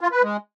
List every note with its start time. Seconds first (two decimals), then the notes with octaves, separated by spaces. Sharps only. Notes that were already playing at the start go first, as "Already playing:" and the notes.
0.01 F4
0.12 B4
0.23 G#3